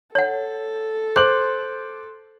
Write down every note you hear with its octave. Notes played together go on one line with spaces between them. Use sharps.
A4 C#5 F#5
C5 C6 D6 F#6 G6 F#7